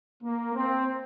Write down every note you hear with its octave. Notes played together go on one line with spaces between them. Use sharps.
A#3
C4